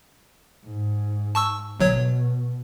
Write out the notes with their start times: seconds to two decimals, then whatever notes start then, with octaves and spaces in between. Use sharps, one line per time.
0.66 G#2
1.35 A5 C#6 E6
1.80 G1 B2 F#3 C#5